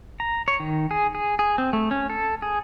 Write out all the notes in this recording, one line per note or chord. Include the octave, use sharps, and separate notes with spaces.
A#5
C#5
D#3
G#4
G#4
G#4
C4
A3
C#4
A4
G#4